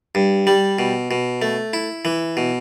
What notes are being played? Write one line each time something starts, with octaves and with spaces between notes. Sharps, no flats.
G2
G3
B2
B2
A3
E4
E3
B2